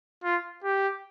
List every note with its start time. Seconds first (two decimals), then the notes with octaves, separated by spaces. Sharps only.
0.24 F4
0.64 G4